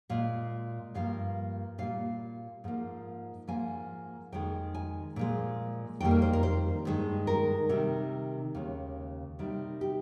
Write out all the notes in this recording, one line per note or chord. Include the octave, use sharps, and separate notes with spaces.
A#2 G#3 F5
G2 F3 A#3 F5
A#2 G3 A#3 F5
G#2 F3 A#3
G#2 F3 A#3 G#5
F2 D#3 G#3 G5
G#5
A#2 F3 G#3
F2 D#3 G3 A#3 G5
A#4
C5
A#4
C5
G2 D#3 G#3
A#4
C3 D#3 G3
D#2 C#3 G#3
C3 D#3 G3
G4